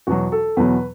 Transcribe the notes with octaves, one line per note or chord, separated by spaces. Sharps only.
E2 B2 F#3 F#4
A4
E2 B2 F#3 B4